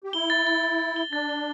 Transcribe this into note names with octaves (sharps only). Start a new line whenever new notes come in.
G4
E4 G7
A6
A6
A6
A6
G7
D4 A6
G7